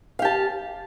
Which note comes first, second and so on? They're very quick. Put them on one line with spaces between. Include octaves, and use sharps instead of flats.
F5 G4 A5